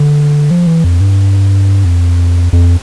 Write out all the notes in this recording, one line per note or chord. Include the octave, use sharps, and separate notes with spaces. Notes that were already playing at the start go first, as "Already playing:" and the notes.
Already playing: D3
F3
E3
F2
G2
F2
F2